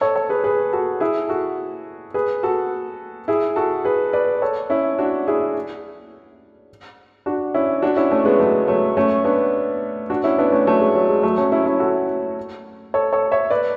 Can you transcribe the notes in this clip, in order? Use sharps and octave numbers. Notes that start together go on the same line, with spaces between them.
A4 C#5
A4 C#5
G#4 B4
G#4 B4
F#4 A4
E4 G#4
F#4 A4
G#4 B4
F#4 A4
E4 G#4
F#4 A4
G#4 B4
B4 D5
A4 C#5
C#4 E4
D4 F#4
E4 G#4
D4 F#4
C#4 E4
D4 F#4
C#4 E4
A3 C#4
G#3 B3
F#3 A3
F#3 A3
A3 C#4
B3 D4
D4 F#4
C#4 E4
B3 D4
A3 C#4
F#3 A3
G#3
F#3
G#3
F#3 A3
A3 C#4
C#4 E4
C#4 E4
F#4 A4
A4 C#5
A4 C#5
C#5 E5
B4 D5